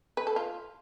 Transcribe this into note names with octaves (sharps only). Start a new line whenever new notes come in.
B4
A4
F4